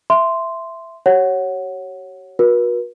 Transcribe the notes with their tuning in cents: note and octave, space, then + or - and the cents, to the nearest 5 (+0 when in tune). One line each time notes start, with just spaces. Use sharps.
E5 +5 C6 -5
G4 -45 C#5 -10 F#5 +0
F#4 -30 B4 -45